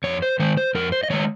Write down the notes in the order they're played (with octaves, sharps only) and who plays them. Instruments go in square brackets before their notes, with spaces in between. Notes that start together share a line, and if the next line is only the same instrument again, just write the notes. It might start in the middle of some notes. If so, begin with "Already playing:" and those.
[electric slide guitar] F2 C#5
C5
D#3 G#3 C5
C5
F2 A#4
C5
D#5
D#3 G#3 C#5